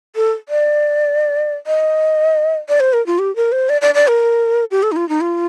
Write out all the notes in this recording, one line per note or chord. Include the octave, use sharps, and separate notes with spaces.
A4
D5
D#5
D5
C5
A#4
F4
G4
A#4
C5
D5
D5
D5
A#4
G4
A4
D#4
F4
D#4
F4